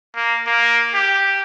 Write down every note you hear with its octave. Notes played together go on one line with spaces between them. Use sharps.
A#3
A#3
G4